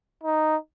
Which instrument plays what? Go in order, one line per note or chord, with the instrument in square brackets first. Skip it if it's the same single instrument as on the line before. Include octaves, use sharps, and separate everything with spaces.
[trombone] D#4